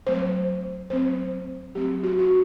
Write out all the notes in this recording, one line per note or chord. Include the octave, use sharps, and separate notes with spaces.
F#3 A3 C4 C5
F#3 A3 C4 C5
F#3 A3 C4 G4
F#4
F#4